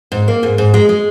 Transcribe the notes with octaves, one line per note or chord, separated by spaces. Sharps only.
G#2
A#3
G#2
G#2
G#3
G#3